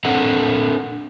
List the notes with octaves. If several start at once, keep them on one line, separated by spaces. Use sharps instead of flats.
C4 D4 A4 F#5 A#5